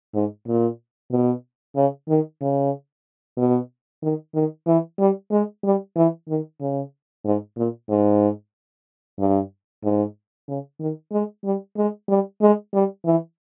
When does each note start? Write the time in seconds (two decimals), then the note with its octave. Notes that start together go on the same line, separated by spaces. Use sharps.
0.15 G#2
0.47 A#2
1.12 B2
1.76 C#3
2.09 D#3
2.41 C#3
3.37 B2
4.03 D#3
4.35 D#3
4.67 E3
4.99 G3
5.31 G#3
5.64 G3
5.96 E3
6.29 D#3
6.61 C#3
7.25 G#2
7.57 A#2
7.89 G#2
9.19 G2
9.84 G#2
10.48 C#3
10.80 D#3
11.12 G#3
11.44 G3
11.77 G#3
12.09 G3
12.42 G#3
12.74 G3
13.06 E3